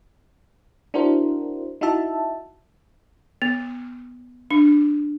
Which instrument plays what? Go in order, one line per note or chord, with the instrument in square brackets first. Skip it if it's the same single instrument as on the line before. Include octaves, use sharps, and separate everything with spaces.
[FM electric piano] D4 E4 F#4 A#4 C5
D#4 E4 F#4 E5 A5
[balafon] B3
D4